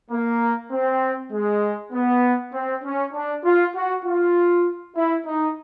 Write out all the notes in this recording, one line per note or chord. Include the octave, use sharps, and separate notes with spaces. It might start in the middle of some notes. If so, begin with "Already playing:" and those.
A#3
C4
G#3
B3
C4
C#4
D4
F4
F#4
F4
E4
D#4